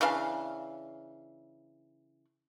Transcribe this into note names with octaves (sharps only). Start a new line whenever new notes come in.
C#3 E3 D4 F5